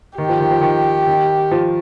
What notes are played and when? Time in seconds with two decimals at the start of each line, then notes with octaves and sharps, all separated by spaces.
0.18 D#3 G4
0.29 F3
0.40 D#3
0.51 F3
0.61 D#3
1.07 D#3
1.51 F3